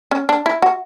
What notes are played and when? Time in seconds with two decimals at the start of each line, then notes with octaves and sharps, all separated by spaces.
0.11 C#4
0.29 D4
0.46 E4
0.62 F#4